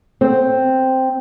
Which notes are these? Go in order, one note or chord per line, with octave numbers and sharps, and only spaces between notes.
C4